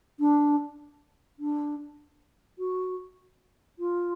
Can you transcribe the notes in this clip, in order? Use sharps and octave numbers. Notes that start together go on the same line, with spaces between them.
D4
D4
F#4
F4